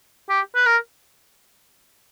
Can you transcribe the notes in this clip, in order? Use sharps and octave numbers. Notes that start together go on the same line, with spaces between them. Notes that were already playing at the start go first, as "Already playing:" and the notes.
G4
B4
A#4